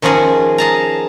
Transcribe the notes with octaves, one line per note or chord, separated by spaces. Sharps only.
D#3 F3 C#4 F#4 G#4
G#4 A5 A#5